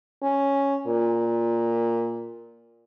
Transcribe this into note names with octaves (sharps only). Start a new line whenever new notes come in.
C#4
A#2